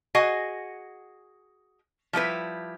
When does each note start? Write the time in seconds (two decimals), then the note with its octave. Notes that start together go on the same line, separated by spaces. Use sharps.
0.15 F#4 G#4 D#5 F#5 G#5
2.13 F3 G3 E4 B4